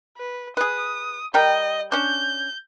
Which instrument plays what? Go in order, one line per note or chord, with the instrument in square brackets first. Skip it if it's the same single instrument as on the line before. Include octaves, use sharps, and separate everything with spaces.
[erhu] B4
[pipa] G#4 B4 [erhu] D#6
[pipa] G3 A#4 G5 [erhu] D#5
[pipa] C#4 D4 [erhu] G6